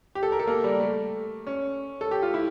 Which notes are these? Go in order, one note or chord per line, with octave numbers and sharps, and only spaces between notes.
G4
A4
A#4
A4
A#3
G3
A3
C#4
A4
G4
F4
E4